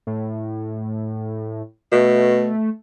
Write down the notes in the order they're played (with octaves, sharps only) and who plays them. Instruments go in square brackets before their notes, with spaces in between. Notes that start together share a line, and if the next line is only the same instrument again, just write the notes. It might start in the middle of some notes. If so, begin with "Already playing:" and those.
[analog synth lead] A2
[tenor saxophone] B2 [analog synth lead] A3